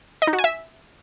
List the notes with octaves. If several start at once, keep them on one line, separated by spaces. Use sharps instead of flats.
D#5
D#4
F#4
G#5
E5